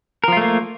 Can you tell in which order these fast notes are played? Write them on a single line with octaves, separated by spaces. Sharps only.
A#4 F3 F4 A3 A#3